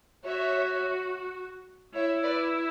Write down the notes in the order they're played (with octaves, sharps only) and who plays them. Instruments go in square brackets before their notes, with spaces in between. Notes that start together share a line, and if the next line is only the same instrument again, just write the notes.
[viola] F#4 [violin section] C#5 E5
[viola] E4 [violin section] C#5 E5
[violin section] B4 D5